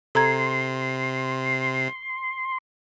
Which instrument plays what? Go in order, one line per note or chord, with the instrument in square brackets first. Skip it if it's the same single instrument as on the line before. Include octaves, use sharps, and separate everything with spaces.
[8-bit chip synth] C3 [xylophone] A4 A#5 G#6 [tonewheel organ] C6